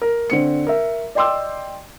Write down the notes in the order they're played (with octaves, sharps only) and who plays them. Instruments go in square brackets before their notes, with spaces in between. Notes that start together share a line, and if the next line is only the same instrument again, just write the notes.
[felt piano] A#4
D3 C4 C#7
A#4 E5
D5 D#5 G5 C6 D6 E6